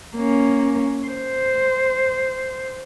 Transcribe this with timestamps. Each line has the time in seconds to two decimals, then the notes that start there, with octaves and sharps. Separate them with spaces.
0.16 A#3 C#4
1.07 C5